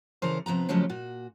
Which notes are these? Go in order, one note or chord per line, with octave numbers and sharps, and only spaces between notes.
C#3 E3 A4 A#4 C5
C3 F3 B3 A#5
C#3 F3 F#3 G#3 A3 C#4
A#2 F#4